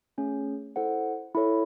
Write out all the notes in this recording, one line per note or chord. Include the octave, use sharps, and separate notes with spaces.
A3 C#4 G#4
E4 A4 C5 F#5
E4 A4 C#5